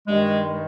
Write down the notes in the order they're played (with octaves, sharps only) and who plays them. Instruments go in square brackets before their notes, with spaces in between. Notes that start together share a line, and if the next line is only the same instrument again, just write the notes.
[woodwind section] G2 D#3 G#3